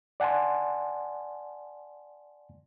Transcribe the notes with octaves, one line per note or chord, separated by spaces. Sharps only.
D5 F#5 G#5 A5 C6